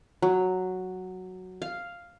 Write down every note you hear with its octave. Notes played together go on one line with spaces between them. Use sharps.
F#3
F5